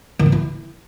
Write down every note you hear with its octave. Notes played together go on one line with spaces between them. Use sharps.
D#3
E3
E4